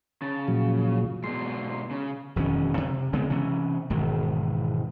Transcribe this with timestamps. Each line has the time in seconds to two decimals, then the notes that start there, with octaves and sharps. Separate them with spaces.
0.22 C#3 A5
0.48 A#2 F3 F#3
1.24 G#2 B2 C6
1.91 C#3
2.36 E1 F2 D#3 C#4
2.77 C3
3.13 C#3 G#3 B3 C4
3.30 C3 E3 C#4
3.90 E1 G#2 D#3